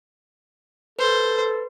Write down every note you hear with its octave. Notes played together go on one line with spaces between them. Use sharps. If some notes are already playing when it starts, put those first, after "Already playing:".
A4 B4 C5